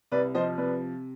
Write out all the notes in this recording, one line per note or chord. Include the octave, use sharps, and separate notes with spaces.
C2 B4 D5
F3 C5 D#5
C3 B4 D5